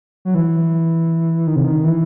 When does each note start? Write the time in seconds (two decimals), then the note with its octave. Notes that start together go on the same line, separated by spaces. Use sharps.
0.25 F#3
0.35 E3
1.47 D#3
1.56 C3
1.64 D#3
1.84 E3